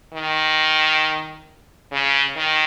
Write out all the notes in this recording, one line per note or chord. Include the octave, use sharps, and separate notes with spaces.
D#3
C#3
D#3